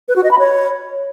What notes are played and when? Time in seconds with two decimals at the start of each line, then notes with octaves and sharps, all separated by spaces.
0.08 B4
0.16 F#4
0.23 D#5
0.31 B5
0.39 C#5